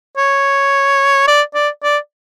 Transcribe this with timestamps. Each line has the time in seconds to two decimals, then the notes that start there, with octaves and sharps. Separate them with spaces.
0.17 C#5
1.28 D5
1.55 D5
1.84 D5